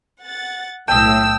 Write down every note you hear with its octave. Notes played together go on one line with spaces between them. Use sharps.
F#5 A6
B1 A2 G5 A5 D#6 E6